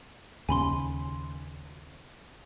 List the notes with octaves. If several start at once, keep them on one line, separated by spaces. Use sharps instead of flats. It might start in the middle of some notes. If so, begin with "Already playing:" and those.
D#2 C#3 C#4 G#5 B5 C6